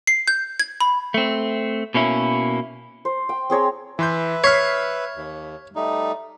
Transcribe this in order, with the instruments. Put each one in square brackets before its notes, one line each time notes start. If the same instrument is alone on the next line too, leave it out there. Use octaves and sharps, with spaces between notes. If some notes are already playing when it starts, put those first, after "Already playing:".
[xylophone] C7
G6
G#6
B5
[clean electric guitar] A3 C4
B2 A#3 C#4 E4
[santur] C5
G5
C4 G#4 C#5 A#5
[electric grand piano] E3 C6 G6 [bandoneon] B4 E5
[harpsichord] C#5 [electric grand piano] F6 B6 C7
[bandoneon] D#2
G3 A3 D#4